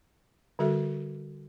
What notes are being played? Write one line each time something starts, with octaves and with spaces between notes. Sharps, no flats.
D3 G3 F#4 A4 E5